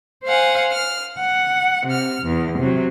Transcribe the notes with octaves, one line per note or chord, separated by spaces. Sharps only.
C5 F5 F#5 G#5
F6
F#5
C3 F6
E2
C3 F#3